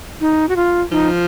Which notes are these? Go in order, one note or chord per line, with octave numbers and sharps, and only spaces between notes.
D#4
F#4
F4
F3 D#4